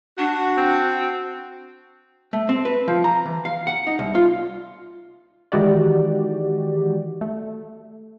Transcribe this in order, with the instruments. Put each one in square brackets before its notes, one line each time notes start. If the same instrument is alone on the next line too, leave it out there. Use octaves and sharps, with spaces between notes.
[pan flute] D4 [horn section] F#4
[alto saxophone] C4
[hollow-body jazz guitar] A3
C4
B4
F3
A#5
E3
F5
F#5
D#4
C2
F4
[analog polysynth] D#3 E3 G#3 F#4 G4 D5
A3